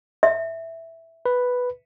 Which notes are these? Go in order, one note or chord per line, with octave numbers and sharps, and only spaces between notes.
E5
B4